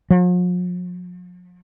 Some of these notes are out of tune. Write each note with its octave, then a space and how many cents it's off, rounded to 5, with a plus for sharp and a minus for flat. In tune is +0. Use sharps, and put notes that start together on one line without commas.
F3 +45